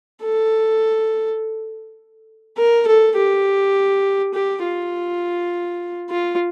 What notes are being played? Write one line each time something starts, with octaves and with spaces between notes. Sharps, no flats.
A4
A#4
A4
G4
G4
F4
F4